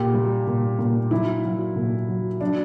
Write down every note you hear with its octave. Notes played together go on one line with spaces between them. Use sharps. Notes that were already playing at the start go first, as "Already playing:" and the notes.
Already playing: A#2 G4
G3
A#2
A#2
F#3 E4
F#3
A#2
F#3
F#3 D4